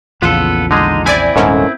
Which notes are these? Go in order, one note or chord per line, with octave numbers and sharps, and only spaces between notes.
A#1 E2 C#3 B3 F4 A4
D3 G#3 D#4 G#4
C4 E4 D5 G#5
D#1 G#2 A#3 C#4 A4